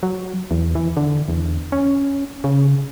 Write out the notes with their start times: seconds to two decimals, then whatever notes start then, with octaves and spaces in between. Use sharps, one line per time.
0.03 F#3
0.51 E2
0.75 E3
0.97 D3
1.28 E2
1.72 C#4
2.44 C#3